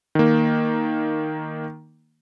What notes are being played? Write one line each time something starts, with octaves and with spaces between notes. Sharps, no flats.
D#3 A#3